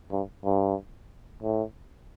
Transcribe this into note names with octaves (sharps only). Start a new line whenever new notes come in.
G2
G2
A2